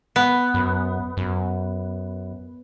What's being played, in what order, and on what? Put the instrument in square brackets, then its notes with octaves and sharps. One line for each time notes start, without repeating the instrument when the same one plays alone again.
[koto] B3
[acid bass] F#2
F#2